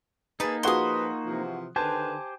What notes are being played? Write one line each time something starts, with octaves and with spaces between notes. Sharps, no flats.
A#3 D#4 G#4 B4 A5
F3 F4 F#4 G#4 B4 C6 D#6
C3 E3 F3
D3 D#3 G4 B4 C5 G#5 A5